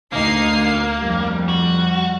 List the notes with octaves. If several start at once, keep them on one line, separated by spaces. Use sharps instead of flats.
D2 A#3 D#4 C7
F2 G3
F#4